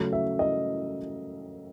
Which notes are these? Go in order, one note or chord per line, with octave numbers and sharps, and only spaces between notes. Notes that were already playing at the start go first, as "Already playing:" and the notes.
Already playing: C#3 F#3 A3 C#4
E5
D#5